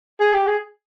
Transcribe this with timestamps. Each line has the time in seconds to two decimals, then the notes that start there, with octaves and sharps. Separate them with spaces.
0.20 G#4
0.34 G4
0.47 G#4